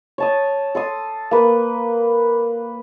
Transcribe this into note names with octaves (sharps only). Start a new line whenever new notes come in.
C#5 A5 D#6
A4 C6 D#6
A#3 B4